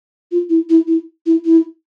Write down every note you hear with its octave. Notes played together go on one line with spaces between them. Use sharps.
F4
E4
E4
E4
E4
E4